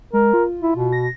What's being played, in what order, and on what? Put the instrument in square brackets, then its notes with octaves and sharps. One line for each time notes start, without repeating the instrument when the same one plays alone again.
[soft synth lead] G#3 [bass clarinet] A#4
[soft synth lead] F4
[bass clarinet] E4
B2
[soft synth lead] A#6